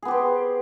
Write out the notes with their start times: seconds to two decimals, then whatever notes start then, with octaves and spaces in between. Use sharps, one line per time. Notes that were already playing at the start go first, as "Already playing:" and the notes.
0.02 G#4
0.05 B3
0.08 G4
0.11 C5